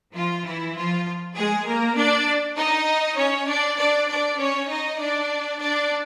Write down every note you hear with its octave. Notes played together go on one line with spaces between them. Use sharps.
F3 F4
E3 E4
F3 F4
G#3 G#4
A#3 A#4
D4 D5
D#4 D#5
C#4 C#5
D4 D5
D4 D5
D4 D5
C#4 C#5
D#4 D#5
D4 D5
D4 D5